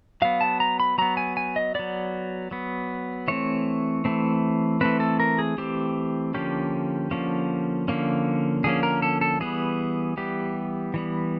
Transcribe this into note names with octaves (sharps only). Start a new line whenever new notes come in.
F#3 B3 F5
A5
A#5
B5
F#3 B3 A#5
G#5
G#5
D#5
F#3 B3 D5
F#3 B3
E3 A3 C4 C#5
E3 A3 C4
E3 A3 C4 B4
A4
A#4
G#4
E3 A3 C4 G4
D3 F3 A#3 C#4 G4
D3 F3 A#3 C#4
D3 F3 A#3 C#4
D3 F3 A#3 C#4 G#4
A#4
A4
A4
E3 G3 B3 G#4
E3 G3 B3 G4
E3 G3 B3